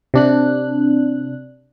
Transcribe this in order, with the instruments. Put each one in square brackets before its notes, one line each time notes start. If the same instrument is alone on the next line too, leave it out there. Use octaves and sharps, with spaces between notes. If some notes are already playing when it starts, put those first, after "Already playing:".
[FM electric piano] C3 D4 F#6